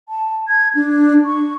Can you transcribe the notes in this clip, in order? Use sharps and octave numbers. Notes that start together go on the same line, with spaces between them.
A5
G#6
D4
C#6